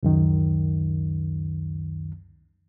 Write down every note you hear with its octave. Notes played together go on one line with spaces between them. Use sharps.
C#2 F#2 D#3